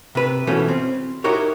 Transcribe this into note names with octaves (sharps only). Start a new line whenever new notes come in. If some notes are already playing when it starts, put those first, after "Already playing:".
C3 B4
B2 E3 F3 A3 C#4
C4
D#4 E4 F#4 G4 A#4 C#5